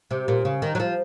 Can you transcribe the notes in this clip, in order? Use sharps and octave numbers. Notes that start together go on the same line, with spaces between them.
C3
A#2
C#3
D#3
F#3
F3